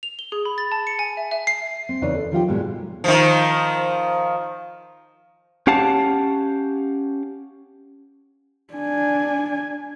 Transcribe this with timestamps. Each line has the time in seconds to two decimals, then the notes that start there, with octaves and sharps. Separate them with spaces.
0.03 F7
0.19 G7
0.32 G#4
0.45 B5
0.58 A6
0.72 A5
0.87 C#7
0.99 G#5
1.17 E5
1.31 E5
1.47 C7
1.89 C4
2.02 E2 C#3 D#4 B4 C#5 D5
2.15 A4
2.31 D#3 F3 F4 G4
2.48 G#2 B2 G3 G#3
3.04 D#3 F3
5.67 C#4 G4 F5 F#5 A5
8.74 D4 G#5